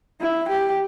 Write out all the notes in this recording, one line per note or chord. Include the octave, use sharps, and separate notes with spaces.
E4
G4